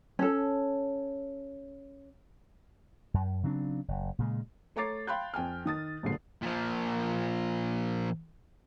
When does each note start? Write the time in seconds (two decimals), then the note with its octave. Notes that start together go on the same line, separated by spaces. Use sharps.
0.19 C#4 A4
3.14 F#2
3.43 C#3 F#3 C4 D4
3.88 F#1
4.19 A#2 C#3 G#3
4.76 A3 C#5 A#5 D6 A6 C7
5.07 F5 G5 B5 C6 F#6 G6
5.34 F2 G5 G#5 F6
5.66 D#3 D#6 A6
6.03 E1 A#1 G2 A#2 D3 C7
6.42 A#2 F3